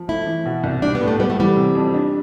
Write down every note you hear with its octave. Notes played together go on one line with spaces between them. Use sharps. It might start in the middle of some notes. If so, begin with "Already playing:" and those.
Already playing: F3
A3 E4
E3
B2
C2
G3 D4
B3
A2
A3
G3 B3
A3
E3 G3
C3
F2
D4